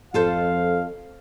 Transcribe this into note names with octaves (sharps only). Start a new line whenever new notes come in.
F2 F4 A4 C5 F5